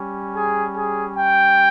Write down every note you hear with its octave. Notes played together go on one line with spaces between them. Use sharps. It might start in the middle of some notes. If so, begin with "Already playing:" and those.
Already playing: G3 C#4
G#4
G#4
G5